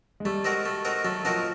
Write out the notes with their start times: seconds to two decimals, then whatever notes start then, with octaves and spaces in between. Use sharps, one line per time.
0.20 G#3
0.25 G3 A3
0.45 C4 D#4 F#4 A#4
0.65 A3
0.85 C4 D#4 F#4 A#4
1.04 F#3 A3
1.25 F3 C4 D#4 F#4 A#4